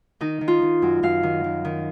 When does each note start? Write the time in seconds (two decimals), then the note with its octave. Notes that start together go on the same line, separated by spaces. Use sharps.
0.21 D#3 D#4
0.41 D#3
0.48 F4
0.62 D#3
0.82 F#2
1.03 F#2 F5
1.23 D#3
1.44 D#3
1.65 D#3